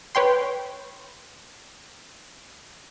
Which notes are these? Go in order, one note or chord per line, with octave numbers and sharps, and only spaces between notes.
B4 C#5 G5 C6